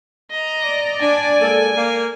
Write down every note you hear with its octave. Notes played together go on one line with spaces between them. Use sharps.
D#5 A#5
D5
D4 G#5
G#3 A#3 A4
A#3